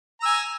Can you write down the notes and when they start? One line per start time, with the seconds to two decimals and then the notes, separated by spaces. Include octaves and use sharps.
0.20 A#5
0.23 E6
0.25 G#5